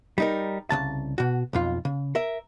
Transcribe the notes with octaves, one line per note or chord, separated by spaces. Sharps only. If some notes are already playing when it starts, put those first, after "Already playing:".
G3 D#4 A#4
C2 C#3 A5
B2 F#4
B1 F2 F4
C#3
A#4 E5